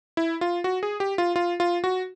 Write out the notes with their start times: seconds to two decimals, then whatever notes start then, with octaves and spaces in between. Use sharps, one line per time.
0.17 E4
0.41 F4
0.64 F#4
0.83 G#4
1.00 G4
1.18 F4
1.36 F4
1.60 F4
1.84 F#4